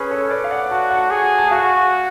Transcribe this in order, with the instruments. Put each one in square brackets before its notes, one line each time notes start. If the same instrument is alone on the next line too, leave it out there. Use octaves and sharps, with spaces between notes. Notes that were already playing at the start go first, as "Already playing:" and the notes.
Already playing: [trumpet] C#4 [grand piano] G#4 B4
[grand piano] A4 C#5
B4 D5
F5
D5 F#5
[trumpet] F#4 [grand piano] A5
[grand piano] F#5 A5
[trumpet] G#4
[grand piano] A5
[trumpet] F#4 [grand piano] F5 G#5